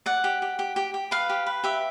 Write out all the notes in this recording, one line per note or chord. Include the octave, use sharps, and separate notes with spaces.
D5 F#5
G4
G4
G4
G4
G4
B4 F5
G4
B4
G4 E5